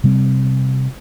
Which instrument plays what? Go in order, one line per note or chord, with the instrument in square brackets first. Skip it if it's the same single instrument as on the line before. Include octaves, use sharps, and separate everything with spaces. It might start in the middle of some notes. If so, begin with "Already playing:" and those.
[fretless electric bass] C3 G3 C4